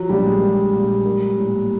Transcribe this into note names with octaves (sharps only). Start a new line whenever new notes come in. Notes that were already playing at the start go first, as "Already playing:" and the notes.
Already playing: F3 F#3
A#1 G3
G#3
A#3
A#2
A#3
A2